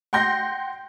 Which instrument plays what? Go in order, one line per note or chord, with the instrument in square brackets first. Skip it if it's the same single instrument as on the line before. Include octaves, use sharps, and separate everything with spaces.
[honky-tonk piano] F#5 G5 C6 G6 A#6